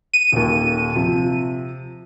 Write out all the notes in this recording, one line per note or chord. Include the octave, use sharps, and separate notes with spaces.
D#7
D#1 D#2
C3 F3